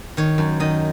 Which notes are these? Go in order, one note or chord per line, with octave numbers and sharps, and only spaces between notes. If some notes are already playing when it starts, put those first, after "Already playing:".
D#3 C#5
F#2
D#3 D#5